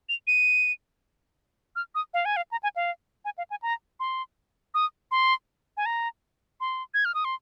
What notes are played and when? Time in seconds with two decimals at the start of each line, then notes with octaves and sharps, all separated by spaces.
0.09 F7
0.27 D#7
1.76 F6
1.95 D#6
2.14 F5
2.25 G#5
2.37 F5
2.51 A#5
2.63 G#5
2.76 F5
3.25 G#5
3.38 F5
3.50 G#5
3.62 A#5
4.00 C6
4.74 D#6
5.11 C6
5.77 G#5
5.86 A#5
6.61 C6
6.94 G#6
7.05 F6
7.15 D#6
7.25 C6